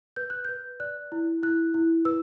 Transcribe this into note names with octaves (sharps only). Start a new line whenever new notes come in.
B4 G6
F#6
B4 G6
D5 F#6
E4
E4 F#6
E4
B4 E6